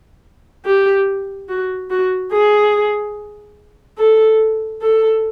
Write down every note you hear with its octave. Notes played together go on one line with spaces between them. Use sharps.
G4
F#4
F#4
G#4
A4
A4